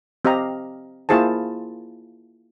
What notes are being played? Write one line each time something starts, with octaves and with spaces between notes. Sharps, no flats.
C4 G4 D#5 F5 A#5
A#3 E4 F4 G#4 C5 A5